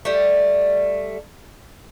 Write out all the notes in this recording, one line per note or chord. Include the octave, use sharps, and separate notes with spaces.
G3 A3